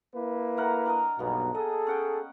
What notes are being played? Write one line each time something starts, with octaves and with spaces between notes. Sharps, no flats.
A#3 E4 B4
A3 A#4 F#5
D4 A#4 D#5
B1 G2 B2 A#3 B3
G#4 A4 D#5
C#4 F#5 G5